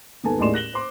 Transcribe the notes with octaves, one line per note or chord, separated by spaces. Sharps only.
D#1 G#2 B3 A4 G#5 A5
D#2 A2 G#3 D5 C6 E7
F#6 A#6 F#7 G7
C5 C6 D6